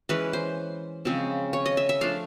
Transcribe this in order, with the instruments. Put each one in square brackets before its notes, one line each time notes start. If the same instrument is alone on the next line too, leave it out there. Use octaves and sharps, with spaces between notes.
[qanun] E3 G#3 C#4 E4 B4
C5
C#3 F3 G#3 C4
C#5
D#5
E5
E5
F3 A3 D4 F5